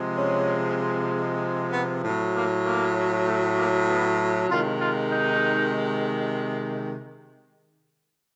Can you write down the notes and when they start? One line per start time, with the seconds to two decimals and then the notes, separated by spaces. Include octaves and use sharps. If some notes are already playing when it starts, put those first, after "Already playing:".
Already playing: C3 F3 G#3
0.18 C#4
1.73 B3
2.04 A2 F#3
2.35 A#3
2.65 A#3
3.26 A3
3.57 A#3
3.88 B3
4.50 C3 D#3 G#3 F4
4.81 F4
5.12 D#4